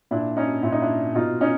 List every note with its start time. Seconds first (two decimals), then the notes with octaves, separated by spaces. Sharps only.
0.11 A#2 D4 E4
0.37 C#4 D#4
0.63 A#2 E4
0.72 D#4
0.82 D4 E4
1.15 B2 D#4 F4
1.41 C#4 D#4